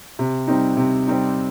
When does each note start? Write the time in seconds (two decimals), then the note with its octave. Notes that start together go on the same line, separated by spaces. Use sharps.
0.19 C3
0.47 G3 C4 D#4
0.77 C3
1.07 G3 C4 D#4